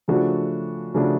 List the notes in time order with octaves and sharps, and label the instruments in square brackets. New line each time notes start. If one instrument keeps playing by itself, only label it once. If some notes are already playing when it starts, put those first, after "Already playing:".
[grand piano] C#3 F3 A3 D4 F#4
C#3 F3 A3 D4 F#4